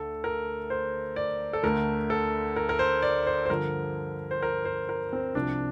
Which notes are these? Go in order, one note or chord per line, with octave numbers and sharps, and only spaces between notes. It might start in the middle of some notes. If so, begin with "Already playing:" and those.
Already playing: D2 D3 A3 A4
A#4
C5
D5
A4
D2 D3 A3 A#4
A4
A#4
A#4
C5
D5
C5
C5
G2 D3 F3 A#4
C5
A#4
C5
A#4
C4
C2 C3 F3 D4